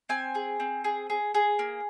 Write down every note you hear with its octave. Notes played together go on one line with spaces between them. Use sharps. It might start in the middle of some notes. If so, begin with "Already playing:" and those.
C4 G#5
G#4
C4
G#4
G#4
G#4
A#3